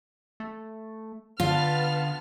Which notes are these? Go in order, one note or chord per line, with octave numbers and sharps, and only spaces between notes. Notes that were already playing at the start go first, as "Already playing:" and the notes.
A3
D3 B3 F4 A5 F6